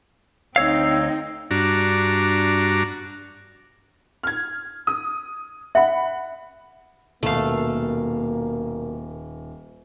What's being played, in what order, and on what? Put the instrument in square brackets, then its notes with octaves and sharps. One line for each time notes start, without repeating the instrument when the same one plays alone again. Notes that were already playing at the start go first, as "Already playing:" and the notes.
[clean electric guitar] D2 C#5 F5 [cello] C4 D#4 [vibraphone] E6
[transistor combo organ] G2 D4 F#4 A#5
[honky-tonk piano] F6 G#6
D#6
[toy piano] E5 [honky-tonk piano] F#5 B5
[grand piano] D#1 [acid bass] B2 [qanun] A3 F5 [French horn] A#3